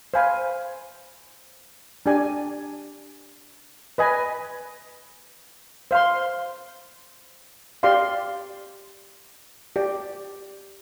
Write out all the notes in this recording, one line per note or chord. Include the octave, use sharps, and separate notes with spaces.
C5 F5 G#5 B5
D4 G4 D5 G#5
B4 D#5 G#5 B5
C5 F5 C6
G4 D5 F5 C6
G4 D5 G5